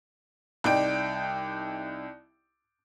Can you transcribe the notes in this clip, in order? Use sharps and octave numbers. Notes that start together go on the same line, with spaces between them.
C2 D#4 D5 G5 D7